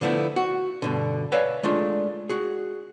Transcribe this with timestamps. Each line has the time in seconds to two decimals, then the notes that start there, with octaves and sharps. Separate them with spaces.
0.01 D3 F3 A3 B3 E4
0.36 F#4
0.82 G2 B2 D3
1.32 B4 C#5 D5 E5 F5 G#5
1.63 G#3 A3 D4 F4
2.29 F#4 G#4